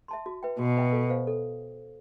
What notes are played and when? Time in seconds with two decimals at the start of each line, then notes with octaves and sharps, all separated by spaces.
0.08 E5 A5 C6
0.26 F#4
0.43 B4 E5 G5
0.59 B2 F#4
0.77 B4 E5 G5
0.92 A4
1.10 C5 F5
1.27 A4